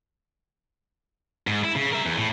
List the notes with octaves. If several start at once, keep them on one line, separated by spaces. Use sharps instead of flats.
G#2
E4
C#3
A#4 E5
E2
A2